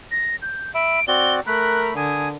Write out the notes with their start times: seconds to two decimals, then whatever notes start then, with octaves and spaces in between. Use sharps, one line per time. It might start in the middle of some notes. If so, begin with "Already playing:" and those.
0.11 A#6
0.42 G6
0.75 E5 B5 D7
1.08 C4 F#4 D5 G7
1.47 A3 A#4 B5 F#6
1.97 D3 G#5 D#6